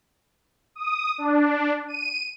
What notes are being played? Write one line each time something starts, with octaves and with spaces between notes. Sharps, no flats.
D#6
D4
D#7